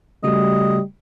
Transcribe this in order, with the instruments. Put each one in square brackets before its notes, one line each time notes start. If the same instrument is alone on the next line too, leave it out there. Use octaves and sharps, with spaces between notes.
[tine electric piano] C#3 A3 F#4 [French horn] G3 [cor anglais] D#5